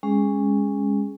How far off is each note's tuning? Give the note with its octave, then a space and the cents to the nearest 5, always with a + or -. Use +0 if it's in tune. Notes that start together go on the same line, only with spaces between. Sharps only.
G#3 -25 C#4 +0 G#4 +0